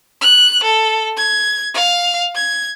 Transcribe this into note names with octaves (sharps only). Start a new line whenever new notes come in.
F#6
A4
G#6
F5
G#6